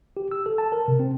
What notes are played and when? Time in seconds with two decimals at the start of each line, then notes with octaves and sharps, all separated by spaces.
0.17 G4
0.31 E6
0.46 A4
0.58 A5
0.72 A#4
0.88 C3
0.99 C4